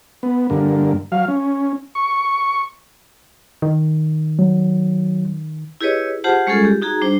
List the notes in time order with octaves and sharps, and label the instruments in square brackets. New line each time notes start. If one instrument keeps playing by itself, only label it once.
[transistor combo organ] B3
G2 D3 A#3
F#3 F5
C#4
C#6
[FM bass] D#3
[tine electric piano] F#3
[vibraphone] E4 G4 G#4 B4 C#5 D#5
F4 G4 G#4 C5 F#5 A5
G3 G#3 C#4 F4 G#4 A4
G4
D#4 F#4 G#4 A#5
G3 D4 C5